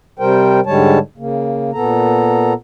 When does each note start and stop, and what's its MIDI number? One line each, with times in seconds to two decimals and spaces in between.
0.19 0.60 48
0.19 0.60 55
0.19 0.60 70
0.19 0.60 72
0.19 0.60 79
0.66 0.99 44
0.66 0.99 50
0.66 0.99 55
0.66 0.99 56
0.66 0.99 73
0.66 0.99 81
1.18 1.71 49
1.18 1.71 58
1.74 2.53 46
1.74 2.53 59
1.74 2.53 69
1.74 2.53 82